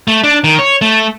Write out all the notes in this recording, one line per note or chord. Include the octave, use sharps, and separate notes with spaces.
A3
D4
D#3
C#5
A3